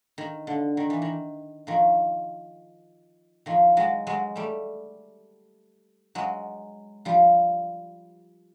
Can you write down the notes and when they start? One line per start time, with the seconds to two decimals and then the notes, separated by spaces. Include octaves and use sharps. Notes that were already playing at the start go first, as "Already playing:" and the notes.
0.18 D#3
0.47 D3
0.77 D#3
0.90 E3
1.02 D#3
1.67 D#3 F3
3.46 D#3 F3
3.77 F#3 G#3
4.07 F#3 G#3
4.36 G3 A3
6.15 F#3 G#3
7.05 F3 G3